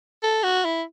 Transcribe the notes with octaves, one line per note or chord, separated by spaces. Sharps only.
A4
F#4
E4